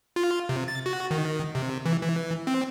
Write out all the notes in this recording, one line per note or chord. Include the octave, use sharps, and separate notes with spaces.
F4
C3
A6
F#4
D#3
C3
E3
E3
C4